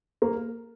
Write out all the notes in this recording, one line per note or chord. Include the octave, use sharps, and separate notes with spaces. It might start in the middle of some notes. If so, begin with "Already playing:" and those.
A#3